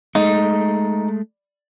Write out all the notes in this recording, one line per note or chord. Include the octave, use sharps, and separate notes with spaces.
G#3 A3 D#4